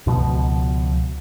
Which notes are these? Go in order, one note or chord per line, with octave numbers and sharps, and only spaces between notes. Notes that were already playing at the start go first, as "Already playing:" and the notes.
C#2 B2 F3